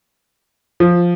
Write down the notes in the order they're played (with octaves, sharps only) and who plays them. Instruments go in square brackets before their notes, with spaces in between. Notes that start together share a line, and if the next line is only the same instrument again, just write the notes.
[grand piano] F3